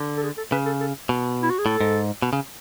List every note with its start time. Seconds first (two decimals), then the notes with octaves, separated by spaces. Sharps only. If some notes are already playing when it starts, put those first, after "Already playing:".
Already playing: D3
0.17 A4
0.23 G#4
0.37 A4
0.52 C#3 B4
0.66 A4
0.80 A4
1.09 B2
1.43 E4
1.50 F#4
1.58 G#4
1.66 A2 A4
1.81 G#2
2.22 B2
2.33 C#3